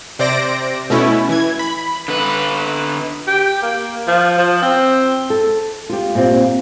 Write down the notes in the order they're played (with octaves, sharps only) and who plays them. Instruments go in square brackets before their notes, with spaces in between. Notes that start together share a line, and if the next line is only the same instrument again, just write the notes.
[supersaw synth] C3 C5 D5 A#6 D7
B2 A3 C#4 E4
E3 G#6
B5
[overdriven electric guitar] D3 B4
[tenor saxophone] G4
A#3
F3
F3
C4
[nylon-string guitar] A4
F4 G4
A#2 C4 G4